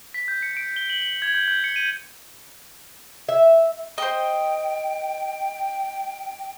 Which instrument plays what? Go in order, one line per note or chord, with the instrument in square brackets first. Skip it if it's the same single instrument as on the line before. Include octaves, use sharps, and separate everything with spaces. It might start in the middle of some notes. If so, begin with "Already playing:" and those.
[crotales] B6
G6
C#7
D7
G7
F#7
F#7
G#6
G6
G6
C#7
D#7
[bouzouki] E5
[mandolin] C5 D#5 [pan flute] G5